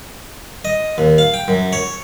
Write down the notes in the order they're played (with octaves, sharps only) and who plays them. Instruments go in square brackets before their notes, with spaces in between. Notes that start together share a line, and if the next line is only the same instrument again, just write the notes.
[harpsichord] D#5
D#2
F5
G5
F#2
C#5